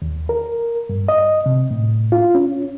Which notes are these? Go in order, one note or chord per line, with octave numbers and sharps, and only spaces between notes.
D#2
A#4
G2
D#5
C3
A2
F4
C#4